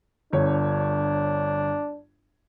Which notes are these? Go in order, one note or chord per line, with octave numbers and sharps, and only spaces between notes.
G1 D4 C#5